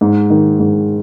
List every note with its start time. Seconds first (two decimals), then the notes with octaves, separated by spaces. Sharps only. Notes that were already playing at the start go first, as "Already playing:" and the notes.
0.01 G#2
0.30 D#3
0.60 G#2